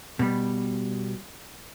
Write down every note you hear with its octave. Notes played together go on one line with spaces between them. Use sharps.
B2 G3